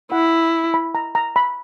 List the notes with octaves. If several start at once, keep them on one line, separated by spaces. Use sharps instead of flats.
E4 F#5
B5
A#5
A#5
B5